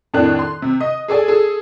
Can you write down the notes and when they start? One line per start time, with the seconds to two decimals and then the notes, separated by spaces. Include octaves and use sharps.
0.14 F2 A2 D#3 D4 F#6
0.39 C6
0.62 C3
0.80 D#5
1.08 G#4 A4 D5 G#5
1.28 G#4 A4